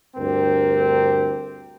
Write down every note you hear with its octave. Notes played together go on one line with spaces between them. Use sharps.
D2 G2 C4 G4 A#4